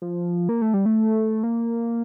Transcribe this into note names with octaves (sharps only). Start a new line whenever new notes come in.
F3
A#3
A3
G3
A3
A#3